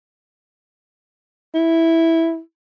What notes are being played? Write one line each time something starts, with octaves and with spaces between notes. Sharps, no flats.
E4